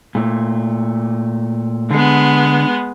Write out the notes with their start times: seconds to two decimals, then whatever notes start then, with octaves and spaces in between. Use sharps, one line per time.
0.15 A#2 A3
1.91 D3 G#3 B3